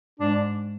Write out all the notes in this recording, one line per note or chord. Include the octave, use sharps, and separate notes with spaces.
G#2 D4